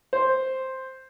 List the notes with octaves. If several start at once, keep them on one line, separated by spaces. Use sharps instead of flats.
C5